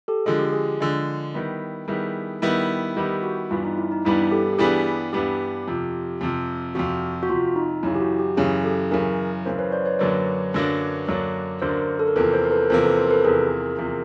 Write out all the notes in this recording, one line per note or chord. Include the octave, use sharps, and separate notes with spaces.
G4 A4
D3 F3 G#3 G#4
G4
G#4
D3 F3 G#3
D#3 G3 B3 E4
D#3 G3 B3 E4 G#4
D#3 G3 B3 E4
D#3 G3 B3 E4 G4
F#4
G2 E3 G3 B3 D4 F4
D#4
E4
D#4
G2 E3 G3 B3 D4 E4
G4 A4
G4
G2 E3 G3 B3 D4 G#4
G2 E3 G3 B3 D4 G4
F2 C3 F3
F2 C3 F3
F2 C3 F3 F#4
F#4
F2 C3 F3 F4
D#4
F#2 C#3 E3 E4
G4
F#4
G4
F#2 C#3 E3 G#4
G4 A4
F#2 C#3 E3 G#4 A#4
F#2 C#3 E3 A#4 C5
B4 C#5
C5 D5
B4 C#5
F#2 D3 F#3 A#3 D4 B4 C#5
F#2 D3 F#3 A#3 D4
F#2 D3 F#3 A#3 D4
F#2 D3 F#3 A#3 D4 A#4 C5
A4
A#4
E2 C3 F3 A#3 A4 B4
A#4 C5
A#4
A4 B4
E2 C3 F3 A#3 A#4 C5
A4 B4
A#4 C5
A4 B4
E2 C3 F3 A#3 G#4 A#4
E2 C3 F3 A#3